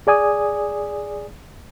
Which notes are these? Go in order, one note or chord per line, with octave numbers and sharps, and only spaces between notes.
G#4 D5 G#5 D#6